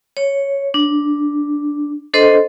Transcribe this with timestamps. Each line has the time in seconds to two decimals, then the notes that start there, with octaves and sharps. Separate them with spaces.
0.17 C#5
0.74 D4
2.14 D4 A4 C5 D#5 C6